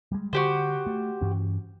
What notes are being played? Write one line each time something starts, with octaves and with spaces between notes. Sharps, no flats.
G3 G#3
D3 F#4 G4 C5
A3
G2 E3 C#4